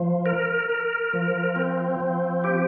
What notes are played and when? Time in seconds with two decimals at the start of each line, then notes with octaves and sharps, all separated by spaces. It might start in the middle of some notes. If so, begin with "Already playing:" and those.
Already playing: F3
0.26 A#4
0.69 A#4
1.13 F3
1.56 C4
2.00 F3
2.44 G4